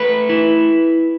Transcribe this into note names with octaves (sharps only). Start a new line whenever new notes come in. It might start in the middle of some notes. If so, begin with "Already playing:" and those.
Already playing: A3 B4
E4